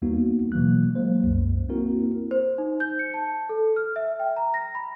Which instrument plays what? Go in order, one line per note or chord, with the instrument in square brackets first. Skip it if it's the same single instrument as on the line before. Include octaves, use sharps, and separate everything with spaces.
[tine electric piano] D#2 G3 A#3 B3 D#4 F#4
B2 E3 F#3 A#3 F#6
F#3 G#3 A#3 C5
C2 F#2
A#3 C4 E4 F#4 A#4
[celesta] C5
D#4
G6
C#7
A5
A4
F6
E5
G5
A#5
A#6
B5